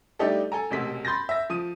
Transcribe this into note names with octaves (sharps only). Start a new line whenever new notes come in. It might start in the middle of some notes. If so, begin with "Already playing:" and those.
G3 A3 D4 D#4 G4 A4
A4 G#5 A#5
E1 A1 C3 B6
B5 C6 G6 A6 A#6
E5 A#6
F3 D#6 D#7